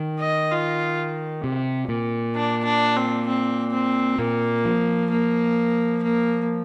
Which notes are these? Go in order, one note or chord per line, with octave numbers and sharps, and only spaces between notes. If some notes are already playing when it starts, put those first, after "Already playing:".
Already playing: D#3
D#5
F4
C3
A#2
D4
D4
C4
C4
C4
A#2 A#3
F3
A#3
A#3